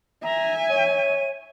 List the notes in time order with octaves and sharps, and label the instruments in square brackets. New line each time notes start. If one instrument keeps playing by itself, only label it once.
[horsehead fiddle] E5 G#5 [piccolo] A#5
[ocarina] C#5 [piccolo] D#7